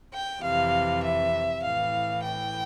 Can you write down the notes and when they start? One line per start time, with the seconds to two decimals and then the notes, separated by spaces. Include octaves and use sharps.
0.13 G5
0.43 F2 C3 E3 F5
1.03 E5
1.63 A2 E3 F5
2.23 G5